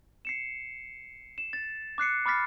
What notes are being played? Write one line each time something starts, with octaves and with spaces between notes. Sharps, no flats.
C7 C#7 E7
E7
A6
D6 F#6 C7 C#7
B5 D6 F6 A6 B6 C7